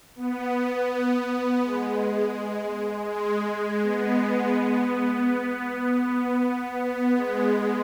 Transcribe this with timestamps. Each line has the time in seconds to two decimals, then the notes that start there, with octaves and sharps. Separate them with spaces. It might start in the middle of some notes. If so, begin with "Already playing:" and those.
0.16 B3
1.63 G#3
3.09 G#3
3.46 G#3
3.82 B3
6.76 B3
7.12 G#3
7.49 G#3